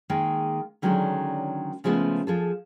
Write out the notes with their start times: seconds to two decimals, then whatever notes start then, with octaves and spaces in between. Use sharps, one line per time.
0.10 D#3 G#3 A#3 G#4
0.82 D3 D#3 F#3 G#3 C#4 D4
1.84 C#3 F3 G#3 A3 B3
2.27 F3 G#4 A4